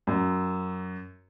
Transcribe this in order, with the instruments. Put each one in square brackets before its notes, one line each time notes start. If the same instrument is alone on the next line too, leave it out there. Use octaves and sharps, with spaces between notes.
[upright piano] F#2